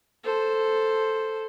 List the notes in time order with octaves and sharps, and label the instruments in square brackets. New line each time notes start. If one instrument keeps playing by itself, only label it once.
[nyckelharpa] A4 C5